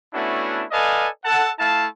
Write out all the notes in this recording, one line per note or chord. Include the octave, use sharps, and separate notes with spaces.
A3 B3 C#4 D4 E4 F#4
A4 B4 D5 D#5 F5 G#5
A4 F#5 A5
A3 E4 F5 A5